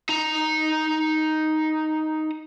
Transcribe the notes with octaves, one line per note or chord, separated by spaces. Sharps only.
D#4 A#5